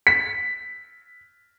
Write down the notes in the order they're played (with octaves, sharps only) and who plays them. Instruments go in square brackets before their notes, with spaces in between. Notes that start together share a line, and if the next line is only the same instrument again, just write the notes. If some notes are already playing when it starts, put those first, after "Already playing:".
[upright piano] B6